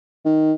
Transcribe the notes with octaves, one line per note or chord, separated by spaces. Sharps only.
D#3